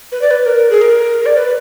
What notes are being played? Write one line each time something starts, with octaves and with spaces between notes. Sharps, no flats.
B4
D5
B4
A#4
G#4
A#4
D5
B4